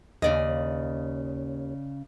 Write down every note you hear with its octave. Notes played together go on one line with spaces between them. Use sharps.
D#2 C#3 D5 D#5